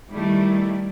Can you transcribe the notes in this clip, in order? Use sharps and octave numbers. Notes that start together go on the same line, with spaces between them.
D#3 G3 A3 E4